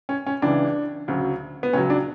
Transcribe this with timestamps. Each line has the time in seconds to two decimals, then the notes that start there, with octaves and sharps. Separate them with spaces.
0.09 C#4
0.26 C#4
0.42 C#2 C#3 E3 D4
1.08 D2 C#3 F#3
1.63 B3
1.73 C#2 C#3 F#3 C#4
1.90 D4